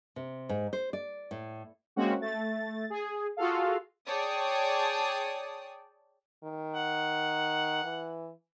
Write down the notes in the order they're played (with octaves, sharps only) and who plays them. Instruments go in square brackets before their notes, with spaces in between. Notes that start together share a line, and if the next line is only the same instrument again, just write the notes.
[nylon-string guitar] C3
G#2
C5
D5
A2
[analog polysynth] G#3 A#3 C4 C#4 F#4
A3 A6
G#4
F4 F#4 G#4 A4 F5
[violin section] G#4 C#5 D5 G5 A5 D#6
[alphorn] D#3
[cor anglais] F#5
[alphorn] E3